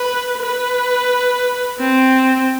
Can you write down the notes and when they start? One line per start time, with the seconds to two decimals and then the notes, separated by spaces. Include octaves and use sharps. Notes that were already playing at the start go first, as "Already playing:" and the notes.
Already playing: B4
0.42 B4
1.79 C4